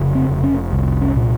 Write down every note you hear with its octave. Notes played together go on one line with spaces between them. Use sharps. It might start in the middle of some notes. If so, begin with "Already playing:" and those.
Already playing: F1 C#3
C4
F1
C#4
C2
C#4
A#2